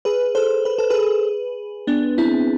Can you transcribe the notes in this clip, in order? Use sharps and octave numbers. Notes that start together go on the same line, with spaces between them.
G#4 B4
A4 C5
B4
A4
G#4 B4
B3 D4
C4 E4